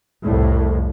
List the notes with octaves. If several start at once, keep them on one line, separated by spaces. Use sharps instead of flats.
C2 F2 A2